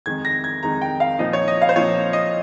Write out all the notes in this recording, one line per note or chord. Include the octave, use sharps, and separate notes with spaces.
F2 D#3 G#3 D#4 G#6
A#6
G#6
F2 D#3 G#3 D#4 A#5
G5
F5
A#2 F3 C4 D#4 D#5
C#5
D#5
F5
C5
A#2 F3 C4 D#4 C#5
D#5